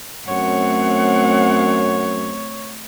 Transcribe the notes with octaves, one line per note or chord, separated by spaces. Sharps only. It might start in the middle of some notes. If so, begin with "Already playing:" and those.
F#2 A3 C4 C#5 F#5